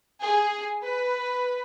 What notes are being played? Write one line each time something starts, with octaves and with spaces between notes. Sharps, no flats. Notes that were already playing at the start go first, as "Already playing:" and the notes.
G#4
B4